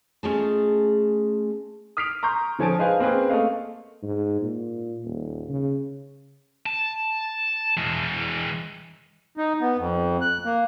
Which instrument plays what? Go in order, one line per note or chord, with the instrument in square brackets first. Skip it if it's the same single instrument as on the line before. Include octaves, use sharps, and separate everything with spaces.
[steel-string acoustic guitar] A3 C#4 F4 G#4 D#5 A5
[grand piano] D#6 F6 B6 C7 D7 F7
A#5 C6 C#6 G6
D3 F3 C#5 G#5 A5 D7
G#3 D#4 B4 C5 F5 G#5
A#3 C4 C#4 G#4 B4
A3 A#3 D#5 F5
[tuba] G#2
A#2
D#1
C#3
[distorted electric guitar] A5
E3 G#3
[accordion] D#4
B3
F2
F#6
A#3